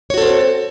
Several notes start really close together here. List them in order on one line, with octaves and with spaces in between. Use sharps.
C#5 F#4 A4 C4